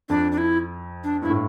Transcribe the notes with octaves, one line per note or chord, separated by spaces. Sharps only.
F2 D4
D4
E4
D4
G2 E4
A2